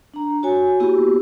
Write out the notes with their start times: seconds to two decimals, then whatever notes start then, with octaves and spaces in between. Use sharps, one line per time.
0.14 D4 A#5
0.43 F#4 C#5 G#5
0.80 A#3 B3 E4 F#4 G4